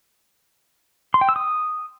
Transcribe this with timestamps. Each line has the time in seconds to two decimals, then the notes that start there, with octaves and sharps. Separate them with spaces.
1.14 C6
1.21 G5
1.29 E6
1.36 D#6